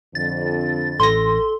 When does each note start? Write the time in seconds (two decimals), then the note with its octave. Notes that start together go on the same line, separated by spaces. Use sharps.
0.15 F2 D3 A6
1.00 A1 A4 C6 A#6